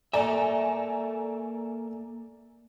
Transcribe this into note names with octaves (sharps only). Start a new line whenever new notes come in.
A#3 A4 D5 E5 G#5 A#5